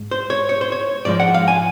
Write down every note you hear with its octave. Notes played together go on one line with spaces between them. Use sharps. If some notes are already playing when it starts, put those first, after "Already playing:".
Already playing: G#2
C5
C#5
C#5
C5
C#5
G#2 F3 G#3 D5
F#5
F5
G#5